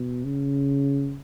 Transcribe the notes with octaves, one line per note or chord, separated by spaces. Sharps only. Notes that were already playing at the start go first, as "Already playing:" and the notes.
Already playing: B2
C#3